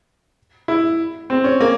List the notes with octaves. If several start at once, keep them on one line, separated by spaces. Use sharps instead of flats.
E4
C4
C#4
A#3